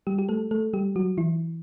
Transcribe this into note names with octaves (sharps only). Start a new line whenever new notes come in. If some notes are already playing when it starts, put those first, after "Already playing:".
G3 G4
G4
A3 A4
A3 A4
G3 G4
F#3 F#4
E3 E4